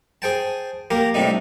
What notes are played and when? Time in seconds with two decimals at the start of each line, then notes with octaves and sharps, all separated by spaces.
0.22 G#4 C5 G5 A5
0.91 A#3 G4 A#4
1.14 A2 C3 G3 D4 D#4